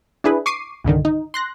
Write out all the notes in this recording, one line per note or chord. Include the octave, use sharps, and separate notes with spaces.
D4 E4 G#4 B4
C#6 D6 C7 D#7
C2 G2 D3 D#3
D#4
C6 F#6 A#6